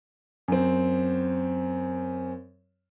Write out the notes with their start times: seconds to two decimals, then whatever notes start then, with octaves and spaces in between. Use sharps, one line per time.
0.48 F#2 C4